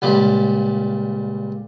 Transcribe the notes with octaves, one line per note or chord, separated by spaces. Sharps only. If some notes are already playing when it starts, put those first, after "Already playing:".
C#2 A#2 G3 G4